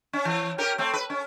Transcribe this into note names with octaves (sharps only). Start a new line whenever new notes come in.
C#4
E3
C#4 G4 A#4
A3 C4
B4
C#4